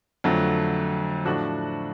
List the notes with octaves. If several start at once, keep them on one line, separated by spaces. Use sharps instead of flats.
F2 D3 F#3 A3
A2 F3 A3 D4 F#4